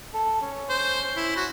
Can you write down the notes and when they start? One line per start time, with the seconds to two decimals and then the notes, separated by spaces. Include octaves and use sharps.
0.14 A4
0.42 C#4
0.69 C5
1.16 E4
1.37 F#4